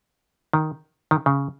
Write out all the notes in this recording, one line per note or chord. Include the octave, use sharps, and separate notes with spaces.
D#3
D#3
C#3